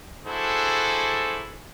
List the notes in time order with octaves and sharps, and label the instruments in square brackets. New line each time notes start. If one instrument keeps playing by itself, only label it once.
[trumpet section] D4 E4 F#4 G#4 A4 C5